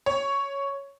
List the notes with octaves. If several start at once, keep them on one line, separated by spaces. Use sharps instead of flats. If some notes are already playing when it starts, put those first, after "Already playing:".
C#5